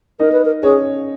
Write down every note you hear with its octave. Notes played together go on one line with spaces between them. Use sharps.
D#4 A#4 D#5
B4
A#4
C#4 G#4 C#5